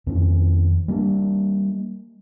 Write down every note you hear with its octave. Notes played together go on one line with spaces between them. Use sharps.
F2 D#3 B3 C#4
G3 A#3 D4